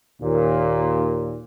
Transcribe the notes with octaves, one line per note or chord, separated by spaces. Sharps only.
D#2 A#2